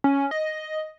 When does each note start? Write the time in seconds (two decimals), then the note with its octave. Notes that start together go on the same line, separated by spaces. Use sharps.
0.04 C#4
0.31 D#5